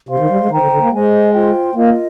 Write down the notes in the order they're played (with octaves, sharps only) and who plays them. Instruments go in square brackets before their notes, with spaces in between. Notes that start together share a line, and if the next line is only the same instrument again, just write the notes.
[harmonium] C3 [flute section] C5 F5 C6
[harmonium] D#3
G3
G#3
[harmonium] D#3 [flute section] C5 G5 A#5
[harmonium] D3
D3
A#3
[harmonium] G#3 [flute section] C5 D#5 G#5
[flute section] F4 C5 G5 C6
[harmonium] A#3 [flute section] F4 A#4 D#5